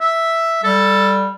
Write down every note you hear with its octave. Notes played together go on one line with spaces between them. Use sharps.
E5
G3 A4